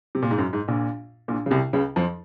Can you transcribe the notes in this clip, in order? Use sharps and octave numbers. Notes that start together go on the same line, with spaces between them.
C3
A#2
G#2
F#2
G#2
A#1 A#2
A#1 A#2
C#3
C2 C3
C#2 C#3
F2 F3